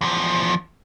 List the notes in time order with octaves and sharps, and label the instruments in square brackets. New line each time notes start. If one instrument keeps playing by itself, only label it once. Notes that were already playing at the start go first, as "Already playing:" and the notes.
[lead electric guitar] E2 F3